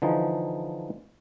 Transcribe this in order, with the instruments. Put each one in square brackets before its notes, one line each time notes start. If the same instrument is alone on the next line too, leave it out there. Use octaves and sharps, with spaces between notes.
[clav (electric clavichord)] D3 E3 F3 D#4